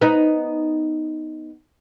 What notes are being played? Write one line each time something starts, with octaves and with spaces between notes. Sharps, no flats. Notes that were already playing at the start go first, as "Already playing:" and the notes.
B3 D#4